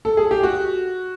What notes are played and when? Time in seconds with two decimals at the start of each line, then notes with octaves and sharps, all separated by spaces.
0.05 A4
0.17 G#4
0.31 G4
0.43 F#4